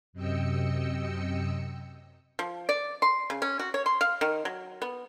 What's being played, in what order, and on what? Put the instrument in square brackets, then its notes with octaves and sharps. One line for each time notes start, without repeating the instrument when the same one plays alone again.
[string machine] F#2 C3 D#5 G5 E6 C#7
[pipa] F3
D5
C6
C#3
C#4
F#4
C#5
C6
F5
D#3
F#3
B3